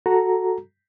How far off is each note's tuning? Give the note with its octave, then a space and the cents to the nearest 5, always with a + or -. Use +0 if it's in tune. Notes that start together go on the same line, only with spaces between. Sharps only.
F#4 +0 A4 +0 A#5 +0